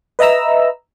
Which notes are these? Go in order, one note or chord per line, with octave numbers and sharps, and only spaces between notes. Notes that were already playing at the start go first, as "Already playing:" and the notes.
B4 D#5 E5 A#5 E6